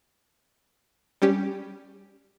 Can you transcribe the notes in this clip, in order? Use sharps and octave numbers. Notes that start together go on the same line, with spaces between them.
G3 C#4 G4